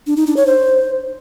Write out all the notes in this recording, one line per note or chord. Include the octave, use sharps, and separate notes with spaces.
D4
D#4
D4
C#5
C5